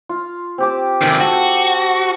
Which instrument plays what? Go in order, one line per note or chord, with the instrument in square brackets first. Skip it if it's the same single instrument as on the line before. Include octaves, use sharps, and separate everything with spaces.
[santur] F4
C4 G4 D6
[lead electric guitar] C3 D#3
[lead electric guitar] F#4 [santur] A4